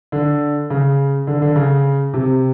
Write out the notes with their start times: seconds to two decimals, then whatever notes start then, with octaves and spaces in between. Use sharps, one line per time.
0.12 D3
0.70 C#3
1.27 D3
1.42 D3
1.56 C#3
2.14 C3